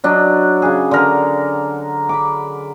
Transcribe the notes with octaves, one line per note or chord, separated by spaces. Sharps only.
F#3 D4 D#5
C#3 G#4
D3 A#4
B5 D6